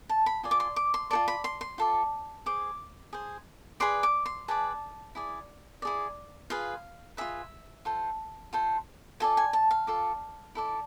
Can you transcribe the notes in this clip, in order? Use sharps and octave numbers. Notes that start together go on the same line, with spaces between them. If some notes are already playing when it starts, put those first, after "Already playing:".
A5
B5
F4 G#4 D5
D6
C6
D6
C6
F4 A4 D5 A5
B5
C6
C6
F4 A4 D5
G#4 C5 D6
G#4 C5
G#4 B4 D5 C6
D6
C6
G#4 B4 D5 A5
E4 G#4 D5
E4 G#4 D5
F4 G#4 B4 F5
F4 G#4 B4 E5
F4 A4 C5
F4 A4 C5
F4 A4 D5 G#5
G#5
A5
F5
F4 A4 D5
E4 A4 D5